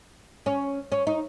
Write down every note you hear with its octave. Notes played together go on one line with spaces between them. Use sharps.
C#4
C#4
D#4